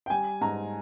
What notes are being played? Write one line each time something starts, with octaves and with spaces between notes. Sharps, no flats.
G5
G3 G#5
G#2 A#5